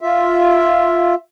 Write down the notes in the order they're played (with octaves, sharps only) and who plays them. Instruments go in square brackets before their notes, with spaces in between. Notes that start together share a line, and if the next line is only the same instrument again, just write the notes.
[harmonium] F4 E5